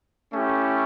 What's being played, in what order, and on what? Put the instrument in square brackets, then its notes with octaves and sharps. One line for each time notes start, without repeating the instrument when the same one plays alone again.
[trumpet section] A3 C#4 E4 G4